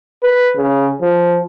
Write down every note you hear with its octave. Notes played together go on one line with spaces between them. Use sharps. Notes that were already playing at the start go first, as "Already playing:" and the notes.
B4
C#3
F3